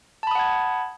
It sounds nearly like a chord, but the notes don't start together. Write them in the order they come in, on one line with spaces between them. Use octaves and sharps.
A5 B5 D#6 F#5 G#6